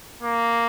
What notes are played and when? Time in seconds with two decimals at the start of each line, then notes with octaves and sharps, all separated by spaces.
0.23 A#3